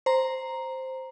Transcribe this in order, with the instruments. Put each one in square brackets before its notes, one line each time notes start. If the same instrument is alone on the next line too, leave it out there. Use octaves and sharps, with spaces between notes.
[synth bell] C5 A#5